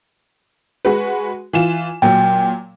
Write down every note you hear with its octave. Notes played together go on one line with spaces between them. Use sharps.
G#3 F#4 B4
E3 F4 E7
A#2 F#3 G5